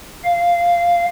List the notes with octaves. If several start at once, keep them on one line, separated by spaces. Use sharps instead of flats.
F5